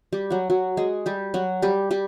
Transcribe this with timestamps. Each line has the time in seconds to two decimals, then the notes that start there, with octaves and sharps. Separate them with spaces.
0.13 G3 G4
0.30 F#3 F#4
0.50 F#3 F#4
0.77 G#3 G#4
1.06 G3 G4
1.34 F#3 F#4
1.62 G3 G4
1.91 G3 G4